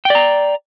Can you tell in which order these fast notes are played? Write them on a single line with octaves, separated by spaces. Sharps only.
G5 D5 A#5